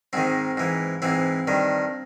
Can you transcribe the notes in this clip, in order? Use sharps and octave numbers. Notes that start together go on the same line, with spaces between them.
G#2 D#3 C4
G#2 E3
G#2 E3 C4
G2 D#3